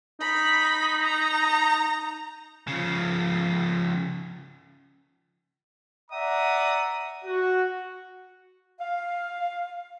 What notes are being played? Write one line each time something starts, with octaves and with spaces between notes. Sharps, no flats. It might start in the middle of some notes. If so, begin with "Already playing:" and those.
D#4 B5
A#5
C#3 F3
D5 E5 F#5 A#5 D#6
F#4
F5